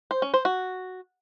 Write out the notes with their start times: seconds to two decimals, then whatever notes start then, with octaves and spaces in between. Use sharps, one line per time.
0.11 C5
0.22 C#4
0.34 C5
0.45 F#4